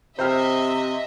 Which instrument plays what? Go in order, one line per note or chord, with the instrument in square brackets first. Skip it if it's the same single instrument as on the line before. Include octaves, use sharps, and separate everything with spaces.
[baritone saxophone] C3 [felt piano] C5 G5 F6 [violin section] D#5 E5